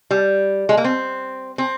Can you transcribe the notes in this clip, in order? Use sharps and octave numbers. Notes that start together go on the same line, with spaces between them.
G3
G#3
A#3
C4
C4